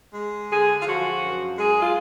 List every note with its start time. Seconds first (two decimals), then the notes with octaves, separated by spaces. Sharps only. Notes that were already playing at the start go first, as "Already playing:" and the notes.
0.14 G#3
0.49 D3 G#4
0.81 F4
0.85 F3 F#4
1.20 F#2
1.56 G#3 G#4
1.79 F4